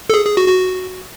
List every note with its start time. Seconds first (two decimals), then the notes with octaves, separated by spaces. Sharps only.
0.10 A4
0.14 G#4
0.25 G#4
0.37 F#4
0.48 F#4